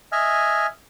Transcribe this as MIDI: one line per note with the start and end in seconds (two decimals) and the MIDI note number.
0.12 0.67 75
0.12 0.67 76
0.12 0.67 80
0.12 0.67 89